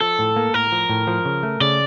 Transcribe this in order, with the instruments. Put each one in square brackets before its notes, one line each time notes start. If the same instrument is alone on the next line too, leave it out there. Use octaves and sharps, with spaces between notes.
[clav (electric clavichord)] F3 [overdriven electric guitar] A4
[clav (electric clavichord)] A2
A#3
[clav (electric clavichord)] A2 [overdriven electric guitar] A#4
[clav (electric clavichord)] F3
A2
F3
C#3
A3
[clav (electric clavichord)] C#3 [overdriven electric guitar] D5